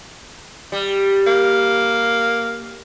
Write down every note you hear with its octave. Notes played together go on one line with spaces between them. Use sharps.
G3
A#3